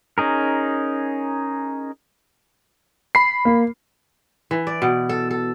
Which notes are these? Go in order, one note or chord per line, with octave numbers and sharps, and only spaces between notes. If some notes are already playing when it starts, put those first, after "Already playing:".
C#4 D#4 G#4 A#4
B5 C7
A#3
E3
D5
B2
A4
A4